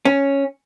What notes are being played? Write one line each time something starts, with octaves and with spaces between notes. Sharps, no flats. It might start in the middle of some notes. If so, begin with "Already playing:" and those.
C#4